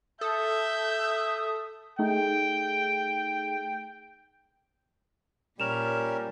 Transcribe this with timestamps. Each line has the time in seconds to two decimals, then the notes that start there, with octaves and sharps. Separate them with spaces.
0.21 A4 E5 D#6 G6
1.99 A3 D#4 G#4 G5
5.60 A#2 G3 C#4 A#4 E7 F7